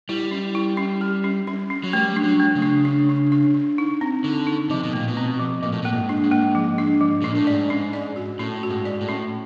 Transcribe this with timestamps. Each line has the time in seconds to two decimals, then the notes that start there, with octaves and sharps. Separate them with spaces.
0.09 G3 E4
0.31 C#4
0.55 E4
0.77 C#4
1.01 G4
1.24 C#4
1.47 C#4
1.70 C#4
1.84 F#3
1.93 G3 A3
2.16 D4
2.23 F#3
2.40 A3
2.55 C#3
2.62 D4
2.85 D4
3.09 D4
3.32 D4
3.54 D4
3.78 D#4
4.01 C4
4.24 D3 D#4
4.47 D#4
4.70 C3 F3
4.83 B2
4.93 A#2 A3
5.08 B2
5.17 C4
5.39 F3
5.62 A#2 F3
5.72 A2
5.82 A#2
5.85 A#3
5.93 G#2
6.09 D4
6.24 G#2
6.32 A#3
6.55 F3
6.78 D4
7.01 F3
7.22 A#2 D4
7.35 A2
7.47 G#2 D5
7.70 C#4
7.93 D5
8.16 F#4
8.39 A2 C#4
8.63 F#4
8.70 G#2
8.85 D5
9.01 A2
9.09 C#4